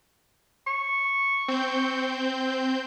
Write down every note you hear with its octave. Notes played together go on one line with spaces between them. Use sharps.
C#6
C4 G6